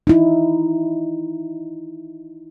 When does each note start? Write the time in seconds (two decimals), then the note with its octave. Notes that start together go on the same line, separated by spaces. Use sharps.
0.07 D#4 E4